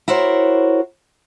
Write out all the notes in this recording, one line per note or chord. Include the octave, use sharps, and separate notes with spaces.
E4 F#4 A#4 C5 C#5